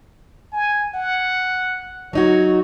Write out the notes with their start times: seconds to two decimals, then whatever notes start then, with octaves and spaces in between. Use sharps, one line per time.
0.53 G#5
0.94 F#5
2.13 F#3 D#4 F#4 C#5